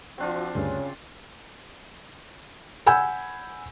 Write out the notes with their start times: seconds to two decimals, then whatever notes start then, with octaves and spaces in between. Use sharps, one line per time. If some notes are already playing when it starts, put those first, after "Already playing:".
0.18 F3 C4 D4 F4 F#4
0.55 D2 G2 C#3 C#4
2.86 F#5 G#5 B5 E6 G6